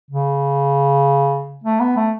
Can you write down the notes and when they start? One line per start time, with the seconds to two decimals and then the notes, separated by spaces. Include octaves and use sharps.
0.11 C#3
1.64 A3
1.80 B3
1.97 A3